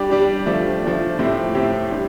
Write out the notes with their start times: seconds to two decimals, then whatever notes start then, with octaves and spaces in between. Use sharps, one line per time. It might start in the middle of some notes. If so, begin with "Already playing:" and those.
Already playing: G3 D4 G4
0.10 G3 D4 G4
0.46 F3 A3 D4
0.82 F3 A3 D4
1.19 A2 A3 C4 G4
1.55 A2 A3 C4 G4
1.91 G3 D4